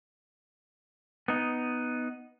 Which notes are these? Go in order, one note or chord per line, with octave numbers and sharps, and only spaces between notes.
B3 D#4